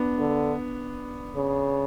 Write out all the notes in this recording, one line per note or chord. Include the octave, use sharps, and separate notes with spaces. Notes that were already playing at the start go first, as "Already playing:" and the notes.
Already playing: B3 D4
D3
C#3